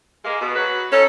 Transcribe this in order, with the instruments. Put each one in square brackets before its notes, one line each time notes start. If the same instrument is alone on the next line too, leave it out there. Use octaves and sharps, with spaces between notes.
[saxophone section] G#3 A#3
B2
F#3 B4
[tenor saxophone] C#4 [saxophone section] D#4 E4 A4